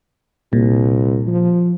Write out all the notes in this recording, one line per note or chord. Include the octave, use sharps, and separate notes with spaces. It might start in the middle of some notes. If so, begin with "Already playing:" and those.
C2 A#2
F3